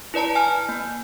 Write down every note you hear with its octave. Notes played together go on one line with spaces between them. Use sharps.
E4 B4 D5 A5 A#5
G#5 F6
A#3